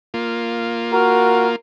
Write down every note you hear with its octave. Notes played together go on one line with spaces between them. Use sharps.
A#3 F4
F#4 A#4